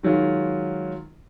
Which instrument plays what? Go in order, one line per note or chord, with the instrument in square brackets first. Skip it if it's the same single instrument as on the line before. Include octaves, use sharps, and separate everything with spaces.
[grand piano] D#3 F#3 G#3 F4